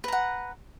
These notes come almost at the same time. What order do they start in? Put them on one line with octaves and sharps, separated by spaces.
B4 A#5 F#5